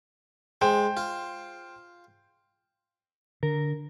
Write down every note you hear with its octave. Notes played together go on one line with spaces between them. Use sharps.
G#3 C5 G5
F4
D3 A#4